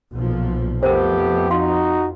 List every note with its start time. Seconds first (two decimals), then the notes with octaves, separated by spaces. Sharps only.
0.13 B1 A#2 F3
0.83 F2 A3 B3 G4 A#4 C5
1.50 D#4 F#4 F5 C6